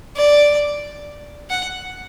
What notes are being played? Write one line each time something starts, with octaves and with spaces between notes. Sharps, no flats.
D5
F#5